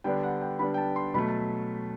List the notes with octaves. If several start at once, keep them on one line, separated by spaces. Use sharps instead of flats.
D3 G3 B3 D4 G5
F#5
G5
D3 G3 B3 D4 B5
G5
A5
C6
B2 F#3 A3 B5
A5